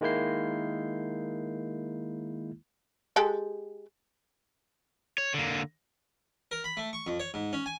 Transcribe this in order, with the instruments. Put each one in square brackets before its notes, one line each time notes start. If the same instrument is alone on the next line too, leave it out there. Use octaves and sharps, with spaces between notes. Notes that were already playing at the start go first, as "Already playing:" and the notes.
[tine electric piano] D#3 G#3 A#3 E4 G6 C7
[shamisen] G#3 G4 A4
[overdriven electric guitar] C#5
D3 A#3
[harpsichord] A#4
B5
A3
C#6
F2
C#5
G#2
C#4
G#5